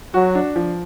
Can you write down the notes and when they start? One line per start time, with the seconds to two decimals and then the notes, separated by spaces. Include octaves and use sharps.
0.14 F#3 F#4
0.35 D4
0.56 F3